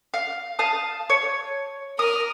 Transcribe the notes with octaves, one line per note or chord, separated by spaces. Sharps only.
F5
F5 A5 D#6
C#5
A#4 D#6